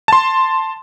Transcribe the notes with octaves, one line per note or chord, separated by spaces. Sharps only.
A5 C6